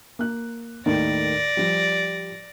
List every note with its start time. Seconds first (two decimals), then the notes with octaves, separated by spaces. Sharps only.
0.19 A#3 F#6
0.86 D#2 A2 D#3 D5 A#6
1.57 F3 G3